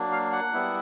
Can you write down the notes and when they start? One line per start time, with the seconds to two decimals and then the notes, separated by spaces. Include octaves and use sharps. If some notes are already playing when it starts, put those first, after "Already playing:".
Already playing: F#3 A#3 D4
0.12 F5
0.32 F#5
0.53 G3 B3 E4